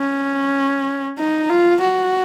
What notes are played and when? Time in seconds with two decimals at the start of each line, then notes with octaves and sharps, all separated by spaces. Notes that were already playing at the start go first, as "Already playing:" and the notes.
Already playing: C#4
1.18 D#4
1.50 F4
1.81 F#4